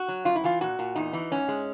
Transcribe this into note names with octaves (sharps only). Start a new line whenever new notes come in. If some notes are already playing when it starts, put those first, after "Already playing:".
Already playing: F#4
F#3
F#2 F4
E4
E3 F4
A#2 F#4
A#2
E2 D#4
E3
G#2 C#4
G#3